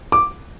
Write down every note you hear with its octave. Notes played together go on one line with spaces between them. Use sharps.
D6